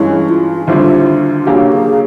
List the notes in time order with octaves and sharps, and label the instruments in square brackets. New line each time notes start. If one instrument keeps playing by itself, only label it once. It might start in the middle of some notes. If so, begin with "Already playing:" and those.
Already playing: [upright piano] G2 E3 G#3 C#4 [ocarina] E4
[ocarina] F4
[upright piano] D#2 D3 G3 C4 E4
[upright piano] C#3 F#3 A#3 D4 G4 [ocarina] F#4
[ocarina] G#4